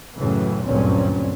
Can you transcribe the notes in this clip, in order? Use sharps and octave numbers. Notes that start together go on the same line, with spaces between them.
F#2 A2 C#3 E3
F#1 D2 G2 A#2 C4 C#4